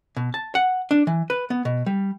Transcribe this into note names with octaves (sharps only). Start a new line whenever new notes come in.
B2
A5
F#5
D4
E3
B4
B3
B2
G3